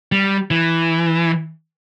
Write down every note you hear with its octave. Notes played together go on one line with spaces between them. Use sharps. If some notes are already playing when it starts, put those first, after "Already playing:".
G3
E3